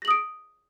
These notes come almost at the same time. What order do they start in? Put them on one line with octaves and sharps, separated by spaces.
A#6 F#7 D#6 D7